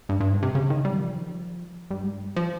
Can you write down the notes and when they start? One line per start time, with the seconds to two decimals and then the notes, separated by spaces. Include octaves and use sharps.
0.09 G2
0.20 G2
0.32 G#2
0.43 C3
0.55 C#3
0.70 D#3
0.85 G3
0.93 D#3
1.00 F3
1.91 G2
2.03 G#2
2.14 G2
2.36 F3